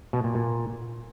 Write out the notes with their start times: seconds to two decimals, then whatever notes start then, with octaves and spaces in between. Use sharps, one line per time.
0.13 B2
0.24 A#2
0.35 A#2